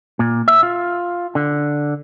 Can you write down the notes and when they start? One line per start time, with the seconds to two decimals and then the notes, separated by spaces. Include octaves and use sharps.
0.19 A#2
0.48 E5
0.63 F4
1.35 D3